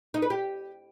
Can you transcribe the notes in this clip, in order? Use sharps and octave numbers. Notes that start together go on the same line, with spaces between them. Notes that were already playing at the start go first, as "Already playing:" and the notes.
D#4
B4
G4